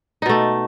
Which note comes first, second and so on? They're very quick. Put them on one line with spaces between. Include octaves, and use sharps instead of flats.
D#4 B2 A3